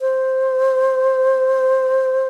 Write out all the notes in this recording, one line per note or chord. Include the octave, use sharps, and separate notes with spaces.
C5